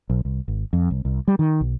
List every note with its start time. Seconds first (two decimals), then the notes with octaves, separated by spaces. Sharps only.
0.10 B1
0.25 C2
0.48 G#1
0.73 F2
0.91 C2
1.05 C2
1.28 G3
1.39 D#3
1.61 B1